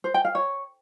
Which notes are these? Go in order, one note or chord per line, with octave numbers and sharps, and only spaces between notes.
C5
G5
F5
C#5